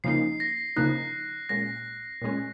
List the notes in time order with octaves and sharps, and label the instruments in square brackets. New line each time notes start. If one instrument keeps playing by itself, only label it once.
[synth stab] C#3 F3 A#3 D#4 [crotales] C7
[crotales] A#6
[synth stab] C#3 F3 A#3 D#4 [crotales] F#6
[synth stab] A#2 G#3 C#4 [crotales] A#6
[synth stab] A#2 G#3 C#4